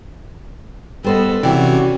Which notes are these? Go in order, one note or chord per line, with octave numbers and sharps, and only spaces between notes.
G3 B3 A4 C5 D#5
C3 E3 C#4 F#4 D5 G5